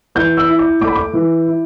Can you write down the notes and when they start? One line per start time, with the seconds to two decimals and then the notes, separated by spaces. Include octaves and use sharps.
0.15 E3 G6
0.37 E6
0.48 E4
0.59 D6
0.81 A3 D6
0.87 B5
0.95 D6
1.13 E3
1.47 E4